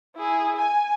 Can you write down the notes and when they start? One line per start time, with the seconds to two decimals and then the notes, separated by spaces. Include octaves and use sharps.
0.16 E4 G#4
0.57 G#5